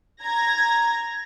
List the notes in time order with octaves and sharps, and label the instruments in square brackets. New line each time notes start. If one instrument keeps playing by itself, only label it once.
[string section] A#5 G#6 A#6